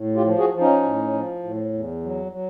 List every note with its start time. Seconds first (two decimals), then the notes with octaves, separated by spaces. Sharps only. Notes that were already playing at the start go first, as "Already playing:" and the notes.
Already playing: A2
0.16 F4 G4
0.24 F3
0.39 F#4 G#4
0.54 F3
0.61 C#4 D#4
0.83 A2
1.13 F3
1.43 A2
1.73 E2
2.03 F#3
2.32 F#3